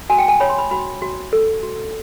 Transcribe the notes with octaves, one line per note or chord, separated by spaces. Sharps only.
F#4 G#5
G5
G#5
C#5 B5
C6
B5
F#4 B5
F#4
A4
F#4